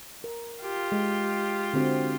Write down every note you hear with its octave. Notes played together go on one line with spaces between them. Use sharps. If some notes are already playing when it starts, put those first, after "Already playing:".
A#4
F4 G4
G#3
D3 C4 F#4